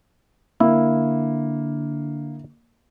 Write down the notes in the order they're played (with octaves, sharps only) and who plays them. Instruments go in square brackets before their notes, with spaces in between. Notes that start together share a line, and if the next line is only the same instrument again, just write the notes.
[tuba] D3 [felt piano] A#3 [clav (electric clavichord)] E4